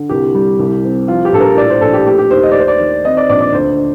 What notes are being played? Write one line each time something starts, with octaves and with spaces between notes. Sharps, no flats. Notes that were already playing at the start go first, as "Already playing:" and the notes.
Already playing: D3
C2 G4
G3
C2
C4
F3 F4
G4
A#1 A4
A#4
A2 D5
C5
A#1 A4
G4
A3 G4
G4
D#2 C5
D#5
D5
D#4 C5
D5
D#3
C4 D#5
D5
A#1 D5
D5
D2 C5